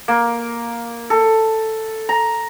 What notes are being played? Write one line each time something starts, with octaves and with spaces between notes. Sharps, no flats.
A#3
A4
A#5